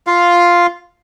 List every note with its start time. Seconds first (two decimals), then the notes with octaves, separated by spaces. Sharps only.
0.07 F4 F5